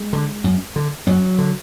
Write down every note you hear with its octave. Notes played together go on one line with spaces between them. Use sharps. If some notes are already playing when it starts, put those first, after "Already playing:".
Already playing: G#3
D3
F#2
D3
F#2 F#3
D3